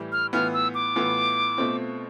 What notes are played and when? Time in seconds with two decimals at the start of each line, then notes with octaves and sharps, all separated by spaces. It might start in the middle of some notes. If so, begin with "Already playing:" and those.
Already playing: A2 E3 G3
0.12 F6
0.33 A2 E3 B3 F4 F6
0.53 E6
0.74 D6
0.96 A2 E3 B3 F4
1.57 B2 A3 C4 F4